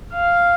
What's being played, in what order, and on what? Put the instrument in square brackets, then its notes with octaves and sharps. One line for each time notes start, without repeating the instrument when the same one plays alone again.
[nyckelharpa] F5